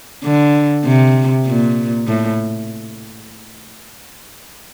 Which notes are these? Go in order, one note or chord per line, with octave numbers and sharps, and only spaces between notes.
D3
C3
A#2
A2